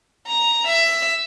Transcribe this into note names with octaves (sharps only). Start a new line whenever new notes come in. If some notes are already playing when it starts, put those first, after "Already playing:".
A#5
E5